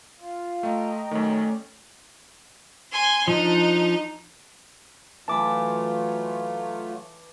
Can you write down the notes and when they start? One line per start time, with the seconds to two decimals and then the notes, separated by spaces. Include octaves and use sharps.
0.19 F4
0.63 A3 D#5 G5 A#5
1.11 F#2 D#3 A3 C#4 D5
2.92 G#5 C6
3.28 F3 D4 D#4
5.28 E3 F#3 A3 F4 A5 B5 D6